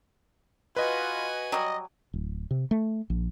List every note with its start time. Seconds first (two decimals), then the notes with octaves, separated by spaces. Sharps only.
0.76 F4 F#4 B4 D#5 G#5
1.52 F#3 G3 D#5
2.13 D1
2.51 C3
2.71 A3
3.10 A#1